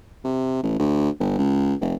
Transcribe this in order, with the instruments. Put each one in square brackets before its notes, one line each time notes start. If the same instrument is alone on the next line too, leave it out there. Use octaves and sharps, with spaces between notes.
[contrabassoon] C3
A1
D2
G1
C#2
F1